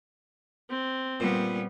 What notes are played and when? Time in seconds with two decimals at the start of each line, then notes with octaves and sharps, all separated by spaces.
0.69 C4
1.20 A#2 G3 B3